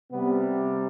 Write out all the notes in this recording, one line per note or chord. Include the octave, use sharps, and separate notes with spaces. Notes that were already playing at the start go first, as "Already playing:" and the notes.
C3 G3 B3